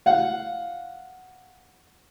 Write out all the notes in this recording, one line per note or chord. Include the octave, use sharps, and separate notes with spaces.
F5 F#5